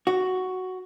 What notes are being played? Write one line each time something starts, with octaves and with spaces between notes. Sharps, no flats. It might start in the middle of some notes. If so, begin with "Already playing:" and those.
F#4